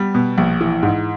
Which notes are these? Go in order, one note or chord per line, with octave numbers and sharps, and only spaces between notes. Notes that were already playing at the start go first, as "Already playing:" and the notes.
Already playing: G3 B3
B2
A#1
E3
G#2